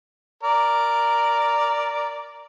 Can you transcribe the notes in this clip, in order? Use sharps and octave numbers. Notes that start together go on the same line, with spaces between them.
A#4 D5